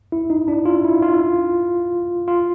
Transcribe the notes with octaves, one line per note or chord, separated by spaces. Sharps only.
E4
D#4
D4
F4
E4
F4
F4